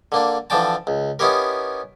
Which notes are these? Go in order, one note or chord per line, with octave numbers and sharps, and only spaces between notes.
D3 A#3 D4
D3 E3 F3 D4 G5 A5
C#2
B3 C#4 D#4 E4 G4 A#4